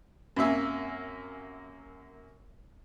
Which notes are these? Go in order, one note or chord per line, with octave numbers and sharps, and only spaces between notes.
F#2 C3 A#3 E5 G#5